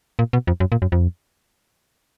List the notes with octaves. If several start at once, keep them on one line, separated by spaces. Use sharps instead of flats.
A#2
B2
F2
F#2
A#2
F#2
F2